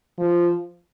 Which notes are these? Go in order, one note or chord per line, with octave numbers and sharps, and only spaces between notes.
F3